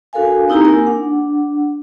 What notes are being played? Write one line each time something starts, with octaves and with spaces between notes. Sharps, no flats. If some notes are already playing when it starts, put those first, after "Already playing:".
D4 F#4 A4 A#4 F5 G#5
C4 D#4 E4 G4 A#5
A#3 A#4 G#5
D4 F#5